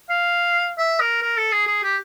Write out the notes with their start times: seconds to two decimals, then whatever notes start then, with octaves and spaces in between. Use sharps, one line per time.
0.10 F5
0.78 E5
1.00 A#4
1.22 A#4
1.37 A4
1.52 G#4
1.67 G#4
1.83 G4